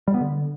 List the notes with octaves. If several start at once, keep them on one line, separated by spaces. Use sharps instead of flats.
G3
B3
D3